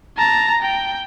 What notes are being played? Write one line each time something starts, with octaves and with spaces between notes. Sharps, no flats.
A5 A#5
G5